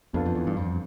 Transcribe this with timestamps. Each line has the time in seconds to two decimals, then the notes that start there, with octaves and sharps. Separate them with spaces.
0.13 F2 B2 B3 D4 F4 A4
0.26 F2
0.35 E2
0.47 G2
0.57 F2